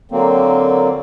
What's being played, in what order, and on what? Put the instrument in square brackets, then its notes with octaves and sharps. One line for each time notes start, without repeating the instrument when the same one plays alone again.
[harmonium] D3 F#3 A#3 C4